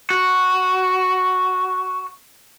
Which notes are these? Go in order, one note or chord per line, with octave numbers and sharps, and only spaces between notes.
F#4